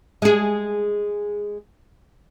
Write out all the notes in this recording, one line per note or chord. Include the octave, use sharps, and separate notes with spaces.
G#3 G#4